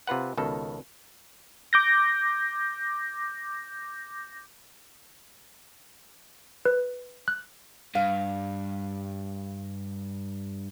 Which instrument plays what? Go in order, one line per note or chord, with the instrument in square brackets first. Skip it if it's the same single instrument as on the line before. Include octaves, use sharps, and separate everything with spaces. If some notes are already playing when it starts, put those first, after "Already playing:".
[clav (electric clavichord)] C3 F4 B4 F#5
C#2 B2 D#3 A4
[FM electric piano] D6 G6 A#6
[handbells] B4
F#6
[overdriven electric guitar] G2 [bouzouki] F5